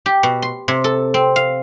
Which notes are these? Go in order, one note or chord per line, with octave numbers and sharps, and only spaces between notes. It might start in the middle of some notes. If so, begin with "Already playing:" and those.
G4
B2
C6
C3
A4
C4
F5